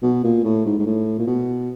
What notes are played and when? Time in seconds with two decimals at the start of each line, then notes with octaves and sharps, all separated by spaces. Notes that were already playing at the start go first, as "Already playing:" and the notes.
0.03 B2
0.24 A#2
0.44 A2
0.65 G#2
0.79 G#2
0.86 A2
1.19 A#2
1.27 B2